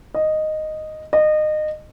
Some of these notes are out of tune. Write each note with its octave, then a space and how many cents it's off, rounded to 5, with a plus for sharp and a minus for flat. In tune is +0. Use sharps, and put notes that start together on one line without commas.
D#5 -5
D#5 -25